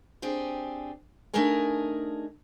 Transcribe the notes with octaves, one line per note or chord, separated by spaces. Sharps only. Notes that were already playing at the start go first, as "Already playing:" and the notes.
C4 D4 G4 G#4
A3 D4 D#4 G#4 A#4 G#5